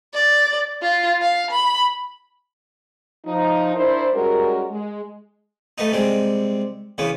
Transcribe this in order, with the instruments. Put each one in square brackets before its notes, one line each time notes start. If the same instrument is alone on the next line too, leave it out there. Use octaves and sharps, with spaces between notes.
[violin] D5
F4
F5
B5
[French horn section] F3 D#4
D4 E4 A#4 C5
G3 G#3 C#4 F#4 A#4
G#3
[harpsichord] A3 B3 D#4
C3 G3 G#3
E2 C#3 B3